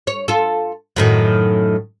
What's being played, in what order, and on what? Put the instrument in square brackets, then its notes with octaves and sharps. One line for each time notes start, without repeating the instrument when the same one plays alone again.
[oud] C#5
F4 A4
F#2 A2 D#3